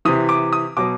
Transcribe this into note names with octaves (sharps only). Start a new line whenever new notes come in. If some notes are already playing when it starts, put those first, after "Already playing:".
C3 E3 D#6
D6
D#6
B2 F#3 D6